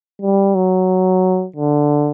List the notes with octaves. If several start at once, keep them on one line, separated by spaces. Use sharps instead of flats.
G3
F#3
D3